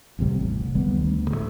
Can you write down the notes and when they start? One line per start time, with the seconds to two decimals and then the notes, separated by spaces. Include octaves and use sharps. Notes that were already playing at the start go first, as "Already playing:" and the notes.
0.19 A1 E2 C3 G3
0.39 A1
0.61 F1
0.74 C#2 D#3 G3 B3
0.97 D2
1.31 A2 F3 A3